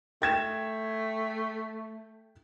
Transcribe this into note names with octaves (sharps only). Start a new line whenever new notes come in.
A3 G5 G#6 E7